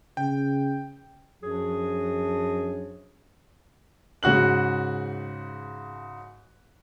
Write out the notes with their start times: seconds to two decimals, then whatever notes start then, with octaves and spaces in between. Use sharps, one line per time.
0.17 C#3 G5
1.42 F#2 F3 F#3 D4 F#4 G#4
4.23 G#2 C#3 F#4 F#6 F#7